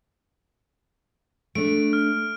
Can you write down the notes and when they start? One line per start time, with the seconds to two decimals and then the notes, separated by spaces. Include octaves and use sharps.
1.55 A3 D4 D7
1.93 F6